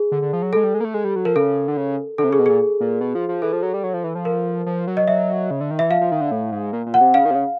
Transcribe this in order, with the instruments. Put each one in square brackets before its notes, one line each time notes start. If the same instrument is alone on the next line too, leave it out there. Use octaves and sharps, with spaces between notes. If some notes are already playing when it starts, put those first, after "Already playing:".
Already playing: [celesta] G#4
[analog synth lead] D3
D3
F3
F#3
[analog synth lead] G#3 [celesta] A4
[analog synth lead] G3
G#3
A#3
A3
G#3
G3
F#3
[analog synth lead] F3 [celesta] A#4
[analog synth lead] C#3 [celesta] A4
[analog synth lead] D3
C#3
[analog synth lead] D3 [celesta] A4
[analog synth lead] C3
[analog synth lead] C#3 [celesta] G#4
[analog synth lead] B2
[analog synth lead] A#2 [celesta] G#4
[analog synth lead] A#2
B2
F3
F3
[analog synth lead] E3 [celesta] A4
[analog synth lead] F3
F#3
G3
F#3
F3
E3
F3
[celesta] A#4
[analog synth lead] F3
F#3
[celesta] D#5
[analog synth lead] F#3 [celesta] E5
[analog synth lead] C#3
D3
D#3
[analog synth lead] E3 [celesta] E5
[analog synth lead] F3 [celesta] F5
[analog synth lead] F3
D#3
D3
A2
G#2
A#2
A#2
[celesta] F#5
[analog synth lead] C3
[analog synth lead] C#3 [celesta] F5
[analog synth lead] D#3
C3
C#3